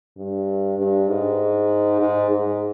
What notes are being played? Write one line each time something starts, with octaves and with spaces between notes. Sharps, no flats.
G2
G2
G#2
G#2
G#2